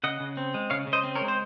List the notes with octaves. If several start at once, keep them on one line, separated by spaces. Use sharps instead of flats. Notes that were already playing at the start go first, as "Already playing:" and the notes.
C#3 D#5 F#5
C#3
C4
G#3
C#3 C#5 F5
C#3
C5 D#5
C4
A#4 C#5
G#3
C5